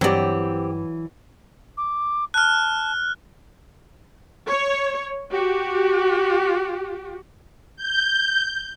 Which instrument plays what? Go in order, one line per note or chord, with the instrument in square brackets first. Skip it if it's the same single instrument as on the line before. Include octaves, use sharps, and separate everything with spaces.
[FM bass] G2 [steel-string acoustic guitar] E3 [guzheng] F#3 D5 [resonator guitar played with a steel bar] C4 G4
[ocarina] D6
[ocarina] A5 [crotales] F6 F#6
[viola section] C#5
F#4 G4
[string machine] G6